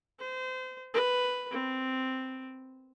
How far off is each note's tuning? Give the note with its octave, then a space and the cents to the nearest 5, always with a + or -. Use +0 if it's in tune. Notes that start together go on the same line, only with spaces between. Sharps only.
C5 -30
B4 +5
C4 -5